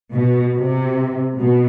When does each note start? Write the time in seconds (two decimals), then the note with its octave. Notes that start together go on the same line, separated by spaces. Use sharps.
0.12 B2
0.54 C3
1.38 B2